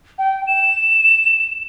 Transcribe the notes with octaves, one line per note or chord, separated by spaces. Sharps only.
G5
E7